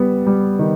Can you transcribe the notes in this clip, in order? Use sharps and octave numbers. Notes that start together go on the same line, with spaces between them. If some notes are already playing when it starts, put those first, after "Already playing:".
Already playing: G3 B3
G3
D#3